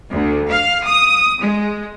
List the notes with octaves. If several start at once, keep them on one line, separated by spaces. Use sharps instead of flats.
D2
F5
D#6
G#3